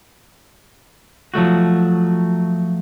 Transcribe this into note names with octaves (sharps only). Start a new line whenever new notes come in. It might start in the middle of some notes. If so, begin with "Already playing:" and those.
F3 F#3 A3 F#4